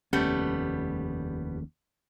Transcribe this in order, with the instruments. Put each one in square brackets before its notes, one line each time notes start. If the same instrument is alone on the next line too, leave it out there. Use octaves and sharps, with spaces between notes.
[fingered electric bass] F1 D#2 C#4 [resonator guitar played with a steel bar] G3 A3 B3